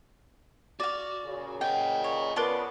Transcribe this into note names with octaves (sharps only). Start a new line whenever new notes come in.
F#4 D5 F5
A#2 C#3
D#5 F#5 G5
C#5
C#3 B3 F4 A#4 B4 D5 A5